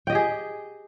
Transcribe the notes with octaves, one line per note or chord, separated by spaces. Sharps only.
G4 G#4 D#5 G5